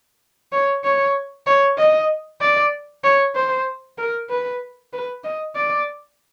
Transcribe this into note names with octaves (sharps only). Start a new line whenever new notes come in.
C#5
C#5
C#5
D#5
D5
C#5
C5
A#4
B4
B4
D#5
D5